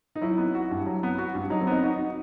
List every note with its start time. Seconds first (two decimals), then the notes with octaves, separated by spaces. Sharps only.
0.16 D#4
0.22 F#3 E4
0.38 B3
0.55 F#4
0.71 G2
0.86 F#3
1.03 B3
1.18 F#4
1.35 G2
1.50 F#3 D#4
1.61 C4
1.67 B3 D#4
1.83 D#4 F#4